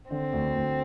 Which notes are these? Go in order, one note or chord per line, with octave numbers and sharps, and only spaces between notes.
D3 C4
D2
D2